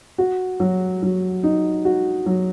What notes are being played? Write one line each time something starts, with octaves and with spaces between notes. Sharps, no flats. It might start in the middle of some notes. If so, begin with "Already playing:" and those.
F#4
F#3
F#3
D#4
F#4
F#3